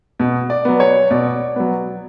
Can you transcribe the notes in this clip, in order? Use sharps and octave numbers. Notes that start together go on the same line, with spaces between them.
B2
D5
F#3 B3
C#5
B2 D5
F#3 B3